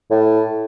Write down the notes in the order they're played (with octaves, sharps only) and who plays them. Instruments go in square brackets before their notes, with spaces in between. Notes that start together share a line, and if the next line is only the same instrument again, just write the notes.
[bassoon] A2